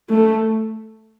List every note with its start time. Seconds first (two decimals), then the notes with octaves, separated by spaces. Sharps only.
0.09 A3